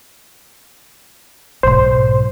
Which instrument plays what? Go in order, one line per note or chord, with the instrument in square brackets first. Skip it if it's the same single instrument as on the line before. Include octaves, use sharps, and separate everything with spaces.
[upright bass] B1 G#2 [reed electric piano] C5 C6